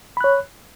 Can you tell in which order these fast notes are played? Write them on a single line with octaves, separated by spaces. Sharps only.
B5 F#6 C#5